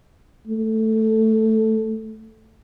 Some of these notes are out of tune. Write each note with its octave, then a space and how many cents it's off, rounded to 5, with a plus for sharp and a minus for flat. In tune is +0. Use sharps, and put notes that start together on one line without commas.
A3 +0